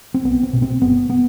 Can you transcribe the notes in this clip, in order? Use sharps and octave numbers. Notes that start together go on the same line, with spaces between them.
C4
B1 B3
C4
B2
C4
F#1 B3
B3